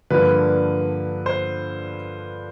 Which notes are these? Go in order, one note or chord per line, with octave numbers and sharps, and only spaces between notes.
G2 D3 F3 A#3 B4
C5